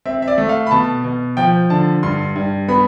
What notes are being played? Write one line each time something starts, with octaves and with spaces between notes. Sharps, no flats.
C4 E5
E5
D5
A3
F5
B5
B2 A5
B2
F3 G5
D3 A5
G2 C6
G2
B3 B5